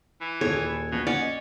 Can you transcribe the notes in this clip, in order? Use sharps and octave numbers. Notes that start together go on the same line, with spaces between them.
E3
D#1 G#4 A4 C#5
A#1 B2
C#4 D5 F#5
D#5